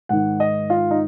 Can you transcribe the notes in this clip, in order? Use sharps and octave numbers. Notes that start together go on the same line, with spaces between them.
G#2 D#3 F#5
D#5
F4
D#4